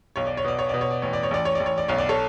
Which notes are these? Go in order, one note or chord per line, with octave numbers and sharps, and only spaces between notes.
B1 C#5
D5
C#5
B2 D5
C#5
B2 D5
C#5
D5
A1 C#5
D5
C#5
A1 D5
C#5
A1 D5
C#5
D5
B1 C#5
D5
A4 C#5